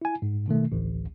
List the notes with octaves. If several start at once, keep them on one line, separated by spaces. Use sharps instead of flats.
E4 G#5
G#2
B2 D#3 A3
A1 D2